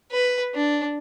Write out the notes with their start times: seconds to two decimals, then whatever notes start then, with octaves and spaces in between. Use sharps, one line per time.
0.12 B4
0.55 D4